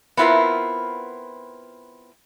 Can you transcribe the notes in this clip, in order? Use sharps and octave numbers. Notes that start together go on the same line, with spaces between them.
B3 C4 E4 F4 A#4 B4